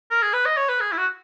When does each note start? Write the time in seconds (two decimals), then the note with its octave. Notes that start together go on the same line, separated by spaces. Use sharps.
0.11 A#4
0.22 G#4
0.33 B4
0.46 D#5
0.57 C#5
0.69 B4
0.80 G#4
0.92 E4
0.97 F#4